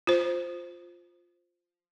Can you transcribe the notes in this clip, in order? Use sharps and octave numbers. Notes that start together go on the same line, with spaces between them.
F4 C5